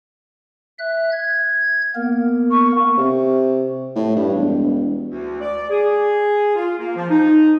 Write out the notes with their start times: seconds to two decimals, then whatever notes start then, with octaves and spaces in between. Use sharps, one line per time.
0.78 E5 F#6
1.12 G#6
1.95 A#3 B3 A#4
2.50 C#6
2.98 C3
3.96 A2
4.16 G2
4.35 E1
5.08 D2
5.41 D5
5.69 G#4
6.55 F4
6.79 A#3
6.96 F3
7.09 D#4